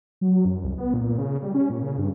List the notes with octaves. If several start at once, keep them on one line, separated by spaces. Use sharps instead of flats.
F#3
F#2
C2
B3
A#2
C#3
G3
C#4
A#2
C#3
G2